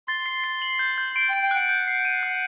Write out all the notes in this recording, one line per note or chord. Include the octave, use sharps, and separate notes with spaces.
C6 A6
C7
C7
F#7
G6
G6
C6 D7
G5 D7
G5
F#5 F#6
G6
C7
D#7
F#6